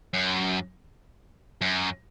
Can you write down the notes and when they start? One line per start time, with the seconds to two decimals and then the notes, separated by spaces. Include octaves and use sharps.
0.14 F#2
1.61 F#2